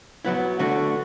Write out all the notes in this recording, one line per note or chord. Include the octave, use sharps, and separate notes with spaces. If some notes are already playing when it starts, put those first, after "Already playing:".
F#3 B3 E4
D3 A3 F#4